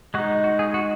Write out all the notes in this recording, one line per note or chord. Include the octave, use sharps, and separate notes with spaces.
G#3 D#4 F#4
F#4
G#4
F#4